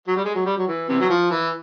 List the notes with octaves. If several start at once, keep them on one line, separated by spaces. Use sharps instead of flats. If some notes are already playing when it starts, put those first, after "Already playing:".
F#3
G3
G#3
F#3
G3
F#3
E3
C3 E3
F#3
F3
E3